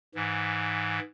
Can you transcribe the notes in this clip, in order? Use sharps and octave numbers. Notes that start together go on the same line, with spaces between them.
G#2 E3